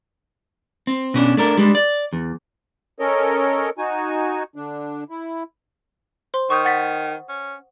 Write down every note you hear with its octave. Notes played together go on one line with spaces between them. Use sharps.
C4
B2 C#4 D4
A3 D4 A#4
G3 G#3 D4
D5
E2
C#4 A4 A#4 C#5 D#5
D#4 F#4 G#5
D3 D4
E4
C5 C6
D#3 C#6 D#6 G6
F#5 A6 B6
C#4